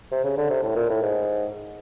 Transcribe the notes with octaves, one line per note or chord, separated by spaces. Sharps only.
C3
C#3
D3
C3
A2
A#2
A2
G#2